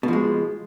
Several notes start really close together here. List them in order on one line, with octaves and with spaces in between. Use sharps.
B2 F3 G#3